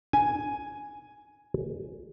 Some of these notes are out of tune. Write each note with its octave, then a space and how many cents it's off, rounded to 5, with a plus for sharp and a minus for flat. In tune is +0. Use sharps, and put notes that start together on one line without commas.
G#5 +5